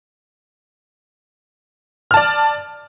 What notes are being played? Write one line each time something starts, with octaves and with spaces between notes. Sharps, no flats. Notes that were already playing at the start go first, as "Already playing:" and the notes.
D5 A5 F6